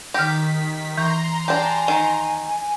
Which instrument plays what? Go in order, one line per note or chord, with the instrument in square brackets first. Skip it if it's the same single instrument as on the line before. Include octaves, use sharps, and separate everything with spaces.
[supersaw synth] D#3 B6 [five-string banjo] G4 [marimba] F6 A#6
[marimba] E3 C#6 G6 [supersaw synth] A#5 C6
[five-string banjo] D4 G4 [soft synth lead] G#5
[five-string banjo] D#3